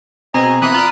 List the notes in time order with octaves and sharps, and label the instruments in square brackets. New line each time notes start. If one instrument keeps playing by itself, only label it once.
[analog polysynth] B2 G#4 [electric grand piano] C4 [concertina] D#5 G#5 [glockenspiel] A#5
[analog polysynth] E3 A#3 B3 [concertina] B5 D#6 F#6
[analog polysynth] F4 D5 [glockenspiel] A#5